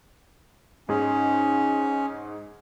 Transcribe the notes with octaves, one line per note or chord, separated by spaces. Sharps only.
G#2 C#4 D#4 G#4